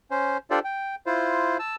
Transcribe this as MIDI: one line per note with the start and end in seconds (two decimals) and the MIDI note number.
0.11 0.37 61
0.11 0.37 72
0.51 0.59 62
0.51 0.59 65
0.51 0.59 67
0.51 0.59 69
0.51 0.59 72
0.51 0.59 74
0.64 0.95 79
1.06 1.57 64
1.06 1.57 65
1.06 1.57 72
1.59 1.76 81
1.59 1.76 88